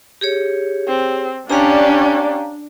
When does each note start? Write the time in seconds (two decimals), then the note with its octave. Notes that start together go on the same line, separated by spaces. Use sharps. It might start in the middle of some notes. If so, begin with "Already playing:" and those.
0.21 G4 G#4 C#5
0.88 C4
1.50 C#4 D4 G4 F5 A#5